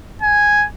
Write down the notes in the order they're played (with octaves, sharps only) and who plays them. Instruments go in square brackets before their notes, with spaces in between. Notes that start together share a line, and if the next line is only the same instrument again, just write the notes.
[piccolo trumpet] G#5